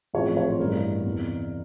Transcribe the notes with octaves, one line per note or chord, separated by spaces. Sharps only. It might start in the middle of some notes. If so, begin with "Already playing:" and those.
A1 G#2 F3 G#3 C4 C#5
C#5
C5
A1 G2 E3 A#4
E2 C3 E3